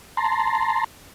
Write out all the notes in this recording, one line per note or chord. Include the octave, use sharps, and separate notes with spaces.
A5 A#5 C6